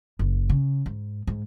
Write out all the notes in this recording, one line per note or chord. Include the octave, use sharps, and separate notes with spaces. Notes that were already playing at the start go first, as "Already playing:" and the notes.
F#1
C#3
G#2
G#2